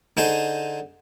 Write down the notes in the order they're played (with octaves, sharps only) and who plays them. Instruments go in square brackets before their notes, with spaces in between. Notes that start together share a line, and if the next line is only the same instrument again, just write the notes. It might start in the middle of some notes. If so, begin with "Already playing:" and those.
[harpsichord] D3 D#4 G#4 C5